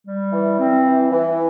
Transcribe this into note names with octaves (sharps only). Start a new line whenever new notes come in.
G3
E3
C4
E3
E3